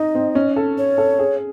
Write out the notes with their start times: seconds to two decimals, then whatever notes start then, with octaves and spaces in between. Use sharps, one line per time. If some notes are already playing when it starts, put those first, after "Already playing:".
Already playing: D#4 D#5
0.15 C4
0.35 C#4
0.56 A4
0.78 C#5
0.98 A4
1.19 G#4